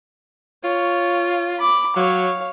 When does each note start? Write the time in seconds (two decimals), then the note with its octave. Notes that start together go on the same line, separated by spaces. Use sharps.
0.64 F4 C#5
1.59 B5 D6
1.96 F#3 C#5 F5